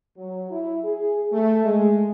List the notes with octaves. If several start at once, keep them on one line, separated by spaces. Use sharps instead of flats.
F#3
E4
G#4
A3
G#3